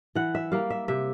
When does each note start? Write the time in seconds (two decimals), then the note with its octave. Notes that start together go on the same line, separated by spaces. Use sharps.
0.15 E3 F#5
0.35 E5
0.52 G3 A#3 F5
0.70 E5
0.88 C3 E5